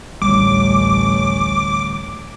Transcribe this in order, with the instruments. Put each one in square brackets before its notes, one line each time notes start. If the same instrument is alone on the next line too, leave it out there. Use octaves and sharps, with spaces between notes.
[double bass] A1 C#4 [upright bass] D2 G3 [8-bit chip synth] D6